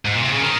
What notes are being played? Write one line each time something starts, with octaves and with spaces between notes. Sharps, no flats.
G#2
A#2
C3
C#3
D#3